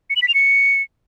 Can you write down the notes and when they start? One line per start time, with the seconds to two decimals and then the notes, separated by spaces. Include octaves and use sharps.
0.10 C#7
0.16 F#7
0.22 B6
0.28 F7
0.34 C#7